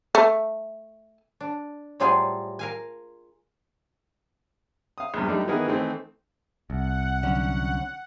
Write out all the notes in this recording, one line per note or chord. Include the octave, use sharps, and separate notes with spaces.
A3
D4
A2 F#3 G3 F4 G#4 C5
A#4 F5 G#5
F5 D#6
A#1 E2 G2
F#2 G3 A3 D4 D#4
D#3 E3 G#3 B3 G#4 A#4
D#3 E3 A3 C4
C2 F#5
D3 F#3 C#4